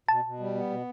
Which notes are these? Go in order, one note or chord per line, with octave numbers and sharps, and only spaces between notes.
B2 A5
B2
G3
B3
B2